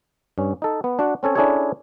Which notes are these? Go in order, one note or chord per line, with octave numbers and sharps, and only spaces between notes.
G2 C#4
D#4 A4
B3
D4 F#4 F#5
C4 C#4 A4 C#5
C#4 D4 E4 G#4 A4 C#5